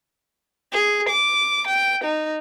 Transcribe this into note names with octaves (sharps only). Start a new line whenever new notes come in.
G#4
D6
G5
D#4